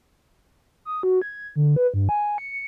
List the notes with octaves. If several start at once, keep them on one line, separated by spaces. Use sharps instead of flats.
D#6
F#4
G#6
D3
B4
G2
G#5
C#7